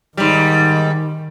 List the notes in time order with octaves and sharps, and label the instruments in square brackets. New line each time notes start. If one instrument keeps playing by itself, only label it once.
[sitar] G#2 G3 [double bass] D#3